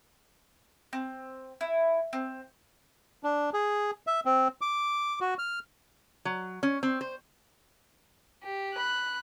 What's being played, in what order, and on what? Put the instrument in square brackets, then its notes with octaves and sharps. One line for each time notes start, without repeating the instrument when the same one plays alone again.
[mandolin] C4
E4
C4
[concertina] D4
G#4
E5
C4
D6
F#4
F6
[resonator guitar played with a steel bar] F#3
C#4
C4
C5
[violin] G4
B5 F#6